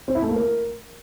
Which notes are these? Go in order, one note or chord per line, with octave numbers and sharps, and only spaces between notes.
C4
E4
A3
A#3
A#4